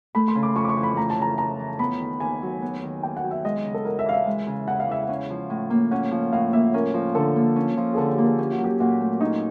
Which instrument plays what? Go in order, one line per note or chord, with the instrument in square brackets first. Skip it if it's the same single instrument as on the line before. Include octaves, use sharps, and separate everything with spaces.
[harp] A3 [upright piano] B5
[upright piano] C6
[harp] C#3
[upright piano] D6
[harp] F2 [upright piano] C#6
[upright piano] D6
C#6
[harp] E3
[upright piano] B5
[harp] A3 [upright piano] A#5
[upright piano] A5
[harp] C#3 [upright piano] A#5
[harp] F2 [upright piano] A#5
[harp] E3
[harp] B3 [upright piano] B5
[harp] D#3
[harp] D#2 [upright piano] G#5
[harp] F#3
B3
D#3
[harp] D#2 [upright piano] G5
[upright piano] F#5
[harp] F#3
[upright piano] E5
[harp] G#3 [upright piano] D#5
[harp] C#3
[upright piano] A4
[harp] E2 [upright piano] A#4
[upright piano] E5
[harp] E3 [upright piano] F5
[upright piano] E5
[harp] G#3
C#3
[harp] E2 [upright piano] F#5
[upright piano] F5
[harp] E3 [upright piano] E5
[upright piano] F5
[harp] C#4
F3
A2
A#3
[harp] C#4 [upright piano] F#5
[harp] F3
[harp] A2 [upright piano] F5
[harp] A#3 [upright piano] E5
[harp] C#4 [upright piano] A#4
[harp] F3
[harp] D3 [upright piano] A4
[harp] A#3
C#4
F3
[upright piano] G#4
[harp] D3 [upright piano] A4
[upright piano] G4
[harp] A#3
[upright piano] G#4
[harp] C#4 [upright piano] G4
[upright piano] F#4
[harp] F#3
[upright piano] G4
[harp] A#2 [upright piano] F#4
[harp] A3
[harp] C#4 [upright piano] D#4